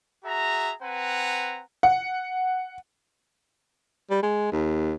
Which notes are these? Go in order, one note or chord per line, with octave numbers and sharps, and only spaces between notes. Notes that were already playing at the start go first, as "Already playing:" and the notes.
F#4 G#4 E5 A#5
C4 B4 F#5 G#5 A#5
F#5
G3
G#3
D#2